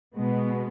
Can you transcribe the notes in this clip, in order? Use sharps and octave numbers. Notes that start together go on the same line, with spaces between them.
B2 G#3 B3